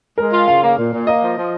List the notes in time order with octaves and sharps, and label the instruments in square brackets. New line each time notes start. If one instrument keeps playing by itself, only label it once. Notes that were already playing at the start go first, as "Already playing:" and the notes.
[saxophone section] G#3 [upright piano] A#4
[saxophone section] F4
[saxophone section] C#3 [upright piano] F5
[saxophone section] A#3
A#2
A#2
[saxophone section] A#3 [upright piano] D#5
[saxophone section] F3
F3